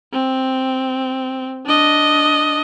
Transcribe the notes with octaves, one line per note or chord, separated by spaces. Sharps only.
C4
D4 D#5